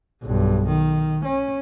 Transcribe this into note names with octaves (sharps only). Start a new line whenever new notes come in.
B1 G2
D#3
C#4